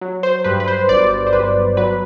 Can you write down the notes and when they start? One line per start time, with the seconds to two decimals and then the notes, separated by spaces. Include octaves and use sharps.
0.01 F#3
0.23 C5
0.44 G2 B4
0.60 B4
0.68 C5
0.89 G1 D5
1.27 C5
1.33 G1 B4
1.77 F#3 B4